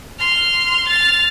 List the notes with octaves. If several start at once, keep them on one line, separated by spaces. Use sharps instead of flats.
C6 F6
F6 A6